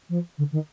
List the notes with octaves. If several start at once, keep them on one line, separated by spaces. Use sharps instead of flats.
F3
D3
D#3